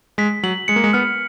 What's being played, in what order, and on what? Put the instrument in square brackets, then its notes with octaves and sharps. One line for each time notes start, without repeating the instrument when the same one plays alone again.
[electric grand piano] G#3 [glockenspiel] B6
[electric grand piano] F#3 [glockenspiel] F#7
[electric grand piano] G#3 [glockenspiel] C#7
[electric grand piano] A#3
G#3
[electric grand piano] B3 [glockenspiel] F6